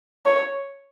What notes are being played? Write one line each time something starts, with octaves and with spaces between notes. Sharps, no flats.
C#5